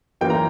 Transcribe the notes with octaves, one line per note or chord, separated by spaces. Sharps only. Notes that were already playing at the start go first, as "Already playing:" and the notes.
F#2 E3 A#3 G5
A#5